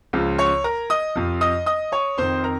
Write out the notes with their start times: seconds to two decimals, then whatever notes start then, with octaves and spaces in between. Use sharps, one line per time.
0.13 C#2 C#3 F3
0.38 C#5 C#6
0.64 A#4 A#5
0.90 D#5 D#6
1.16 F2 C3 F3
1.41 D#5 D#6
1.66 D#5 D#6
1.92 C#5 C#6
2.18 F2 D#3 C5 C6
2.44 A#4 A#5